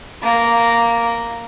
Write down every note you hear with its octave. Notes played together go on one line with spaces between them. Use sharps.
A#3